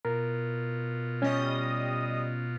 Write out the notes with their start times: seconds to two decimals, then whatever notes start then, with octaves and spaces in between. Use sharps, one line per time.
0.05 B2 F4 A#4
1.22 G3 C#4 D#5 D#6